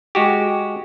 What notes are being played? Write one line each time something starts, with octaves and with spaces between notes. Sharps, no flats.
G#3 F#4 G4